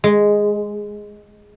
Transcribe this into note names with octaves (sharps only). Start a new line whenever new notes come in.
G#3